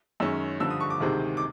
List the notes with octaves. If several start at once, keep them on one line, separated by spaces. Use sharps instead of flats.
F#2 D#3 G#3 C#4 E6
G2 D3 F3 E6
D#6
C#6
D6
D2 C3 D#3 G#3 C4
D6